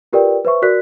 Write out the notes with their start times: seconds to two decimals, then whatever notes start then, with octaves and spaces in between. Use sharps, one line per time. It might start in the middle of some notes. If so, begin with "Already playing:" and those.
0.13 F4 G4 A#4 B4 D5 G5
0.45 B4 C5 E5 C#6
0.62 F#4 A#4 D5 F#6 B6